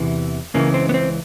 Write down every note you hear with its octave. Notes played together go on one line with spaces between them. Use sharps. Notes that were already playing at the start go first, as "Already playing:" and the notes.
Already playing: E2 C3 E3
C#2 C#3 E3 A#3
C4
B3
C4